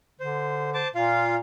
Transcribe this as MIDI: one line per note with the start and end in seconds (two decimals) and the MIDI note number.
0.20 0.84 50
0.20 0.70 72
0.74 0.88 72
0.74 0.88 81
0.74 0.88 86
0.95 1.38 46
0.95 1.35 65
0.95 1.35 77